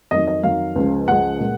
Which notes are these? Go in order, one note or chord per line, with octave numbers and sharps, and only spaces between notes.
F2 D#3 F#3 D#5
D#5
F2 D#3 F#3 F5
C#2 C#3 F3 G#3
C#2 C#3 F3 G#3 F#5
A#2 G#3